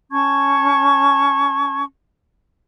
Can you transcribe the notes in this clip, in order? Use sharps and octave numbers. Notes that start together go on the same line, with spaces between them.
C#4 A5 C#6 G#6